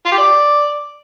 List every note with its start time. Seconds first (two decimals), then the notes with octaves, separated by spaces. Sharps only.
0.06 F4
0.12 G4
0.18 D5